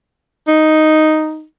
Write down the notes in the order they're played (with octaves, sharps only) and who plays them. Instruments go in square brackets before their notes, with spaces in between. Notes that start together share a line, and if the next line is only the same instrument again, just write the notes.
[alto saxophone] D#4